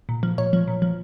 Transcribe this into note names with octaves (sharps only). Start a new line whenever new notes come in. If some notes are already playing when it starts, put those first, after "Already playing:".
A#2
F3
A#2 C#5
F3
A#2
F3